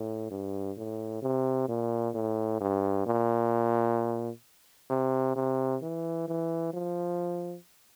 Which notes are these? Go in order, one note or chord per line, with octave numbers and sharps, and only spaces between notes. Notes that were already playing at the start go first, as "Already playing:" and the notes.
Already playing: A2
G2
A2
C3
A#2
A2
G2
A#2
C3
C3
E3
E3
F3